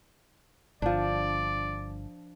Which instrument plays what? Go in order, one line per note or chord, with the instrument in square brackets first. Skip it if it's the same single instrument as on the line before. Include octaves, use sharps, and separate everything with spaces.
[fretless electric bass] G1 [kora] F3 D4 [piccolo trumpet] D5